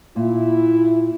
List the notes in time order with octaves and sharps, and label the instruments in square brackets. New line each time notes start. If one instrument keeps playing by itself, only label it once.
[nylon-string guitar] A#2 [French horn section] E4